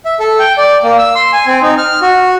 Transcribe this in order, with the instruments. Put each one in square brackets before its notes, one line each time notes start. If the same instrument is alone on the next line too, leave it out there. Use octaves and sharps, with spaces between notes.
[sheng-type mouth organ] E5
A4
G5
D5
A#3
E6
C6
G#5
C4
D#4
F6
F#4